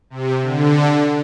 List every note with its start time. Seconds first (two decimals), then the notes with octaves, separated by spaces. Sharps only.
0.10 C3
0.42 D3